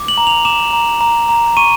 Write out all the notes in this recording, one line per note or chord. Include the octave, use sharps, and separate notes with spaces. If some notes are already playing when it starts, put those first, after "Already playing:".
Already playing: D6
F#7
A#5
F7
D6 E7
A#5
A#5
A#5
C#6 D#7